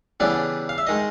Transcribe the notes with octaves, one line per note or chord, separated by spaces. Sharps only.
C#3 E3 G3 B3 D4 D5
F5
E5
D#3 G#3 D#5